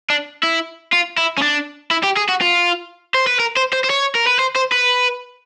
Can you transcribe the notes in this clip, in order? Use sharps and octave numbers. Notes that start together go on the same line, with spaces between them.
D4
E4
F4
E4
C#4
D4
E4
G4
G#4
F#4
F4
C5
B4
A#4
C5
C5
C5
C#5
A#4
B4
C5
C5
B4